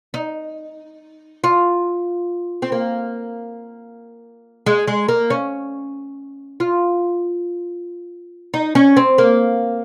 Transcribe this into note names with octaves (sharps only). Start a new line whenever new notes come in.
D#4
F4
C4
A#3
G#3
G#3
A#3
C#4
F4
D#4
C#4
C4
A#3